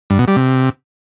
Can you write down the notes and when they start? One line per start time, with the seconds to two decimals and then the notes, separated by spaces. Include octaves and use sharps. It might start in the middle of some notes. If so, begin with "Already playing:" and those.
0.10 G2
0.19 B2
0.28 G3
0.36 C3